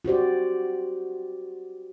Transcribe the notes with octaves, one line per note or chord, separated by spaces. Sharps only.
F#4 G4 C5 D5